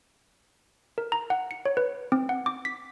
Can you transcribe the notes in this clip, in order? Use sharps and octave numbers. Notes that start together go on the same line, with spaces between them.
A#4
A#5
F#5
C#7
C#5
B4
C4
F#5
D6
B6